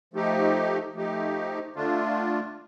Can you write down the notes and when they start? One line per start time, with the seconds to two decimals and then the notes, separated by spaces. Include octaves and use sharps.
0.14 F3 A3 D#4 G4
0.94 F3 A3 D#4 G4
1.75 D3 A3 D4 F4